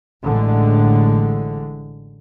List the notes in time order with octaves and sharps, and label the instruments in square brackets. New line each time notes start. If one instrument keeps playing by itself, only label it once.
[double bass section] A1 A2 D3 G#3